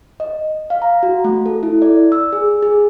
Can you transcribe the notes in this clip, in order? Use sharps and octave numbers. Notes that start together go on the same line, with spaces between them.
D#5
F5
A#5
F#4
A3
A4
E4
D5
E6
G#4
G#4